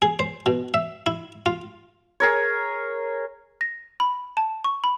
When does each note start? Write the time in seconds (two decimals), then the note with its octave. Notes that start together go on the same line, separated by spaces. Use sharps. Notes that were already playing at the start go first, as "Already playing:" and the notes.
0.02 G#4
0.19 C5
0.46 B2
0.74 E5
1.06 E4
1.46 F4
2.20 G#4 A#4 C#5
3.61 A#6
4.00 B5
4.37 A5
4.64 C#6
4.84 B5